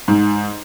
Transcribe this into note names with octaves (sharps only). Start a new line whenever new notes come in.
G#2